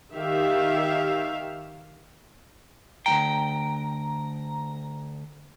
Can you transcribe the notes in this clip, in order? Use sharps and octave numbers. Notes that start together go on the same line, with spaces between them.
D#3 G4 E5 F5
D2 G2 G5 A#5